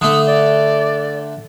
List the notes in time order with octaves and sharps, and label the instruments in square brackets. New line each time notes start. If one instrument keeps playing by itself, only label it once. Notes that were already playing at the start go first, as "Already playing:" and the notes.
[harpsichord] D3 A3 [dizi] D#6
[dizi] D5